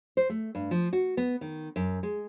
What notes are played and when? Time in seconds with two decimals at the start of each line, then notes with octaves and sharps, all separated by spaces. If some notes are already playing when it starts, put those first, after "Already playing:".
0.17 C5
0.29 A3
0.55 G2
0.71 F3
0.93 F#4
1.17 B3
1.41 D#3
1.76 F#2
2.03 G#3